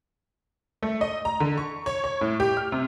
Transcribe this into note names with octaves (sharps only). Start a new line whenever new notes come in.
A3
D#5
A#5
D3
C#6
C#5
C#5
A2
G4
F6
C3